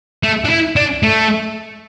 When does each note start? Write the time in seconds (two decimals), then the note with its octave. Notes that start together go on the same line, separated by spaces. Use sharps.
0.23 A3
0.44 D4
0.50 E4
0.76 D4
1.03 A3